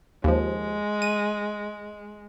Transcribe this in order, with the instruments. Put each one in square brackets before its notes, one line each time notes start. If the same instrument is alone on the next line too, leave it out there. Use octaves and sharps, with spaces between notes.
[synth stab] D#2 F3 [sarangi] G#3
[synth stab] D#7